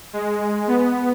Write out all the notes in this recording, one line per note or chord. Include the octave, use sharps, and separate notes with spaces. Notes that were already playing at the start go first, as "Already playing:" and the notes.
G#3
B3